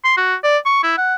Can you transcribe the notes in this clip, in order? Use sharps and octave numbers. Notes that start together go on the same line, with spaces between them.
C6
F#4
D5
C#6
E4
F#5